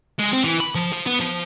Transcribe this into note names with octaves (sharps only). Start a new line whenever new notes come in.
G#3
C4
E3
B5
F3
F3
B3
F3